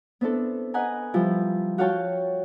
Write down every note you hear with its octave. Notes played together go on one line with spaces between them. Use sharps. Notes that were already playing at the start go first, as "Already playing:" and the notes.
B3 C4 D4 E4 A4
B4 D#5 F#5 G#5 A#5
F3 G3 E4 F4
F#4 C#5 F5 G5 A5 C#6